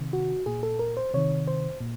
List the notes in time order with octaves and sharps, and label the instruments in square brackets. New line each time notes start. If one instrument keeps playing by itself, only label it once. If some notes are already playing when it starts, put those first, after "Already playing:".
Already playing: [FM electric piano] C3 D#3
F#4
A#2 G#4
A4
A#4
C5
C3 D#3 C#5
C5
A#2